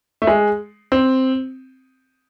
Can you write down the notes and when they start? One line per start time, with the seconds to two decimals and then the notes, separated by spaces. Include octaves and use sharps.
0.22 A3
0.27 G#3
0.92 C4